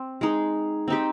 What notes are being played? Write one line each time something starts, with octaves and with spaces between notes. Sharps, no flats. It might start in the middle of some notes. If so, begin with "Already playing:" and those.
Already playing: C4
G#3 D#4 G#4
C4 D#4 G4